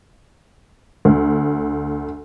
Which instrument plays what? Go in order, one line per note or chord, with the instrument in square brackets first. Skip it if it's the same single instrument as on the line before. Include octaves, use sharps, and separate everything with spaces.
[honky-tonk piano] D2